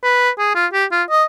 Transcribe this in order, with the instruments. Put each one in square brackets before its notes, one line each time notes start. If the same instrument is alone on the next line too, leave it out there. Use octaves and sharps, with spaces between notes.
[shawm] B4
G#4
F4
G4
F4
D#5